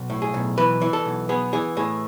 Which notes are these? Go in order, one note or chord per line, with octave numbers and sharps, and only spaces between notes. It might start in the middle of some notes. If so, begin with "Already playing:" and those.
Already playing: B1
A2
G#4
B1
E3 B4
E3
A4
B1
B3 G#4
E3 G#4
A2 G#4